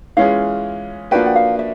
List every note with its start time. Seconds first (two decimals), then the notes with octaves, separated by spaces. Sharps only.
0.17 E3 G#3 C#4 F4 G#4 F5
1.11 F3 A#3 D4 F#4 B4 G5
1.26 F#5
1.35 F5
1.59 E5